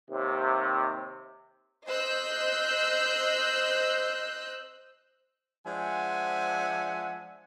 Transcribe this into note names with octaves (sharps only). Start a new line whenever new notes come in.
D#2 C3
C5 D#5 E6 F#6 G6
F3 G#3 D4 E5 F#5 G#5